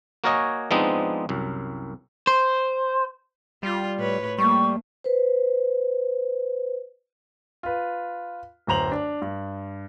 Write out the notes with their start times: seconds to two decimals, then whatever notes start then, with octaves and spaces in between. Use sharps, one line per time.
0.24 A#3 F#4 A#4 C#5 D#5 G#5
0.71 F3 G#3 B3 C4 D4 D#4
1.29 C2 F#2
2.27 C5
3.63 G3 F4
3.98 A2 B4 C#5
4.39 G3 A3 A#3 C#6
5.04 B4 C5
7.63 F4 B4
8.67 D1 F#2 C5 A#5 F7 F#7
8.92 D4
9.22 G2